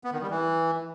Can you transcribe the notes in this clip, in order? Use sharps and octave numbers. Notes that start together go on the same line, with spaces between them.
B3
D#3
G3
E3